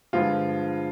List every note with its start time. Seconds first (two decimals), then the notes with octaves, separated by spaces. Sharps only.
0.13 G2 D3 F3 G#3 F4